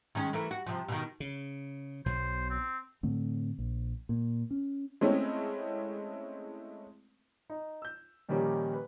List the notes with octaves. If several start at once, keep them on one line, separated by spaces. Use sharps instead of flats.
D#3 G#3 C#4
E3 A3 A#4
F#4
C3 F3
B2 D#3
C#3
B1 B2 F#3 C5
C4
A2 D3 A3 C4
A#1
A#2
C#4
G#3 A3 C4 C#4 E4
D#4
E6 G6
A#2 D#3 F3 G3 C#4 G4
B4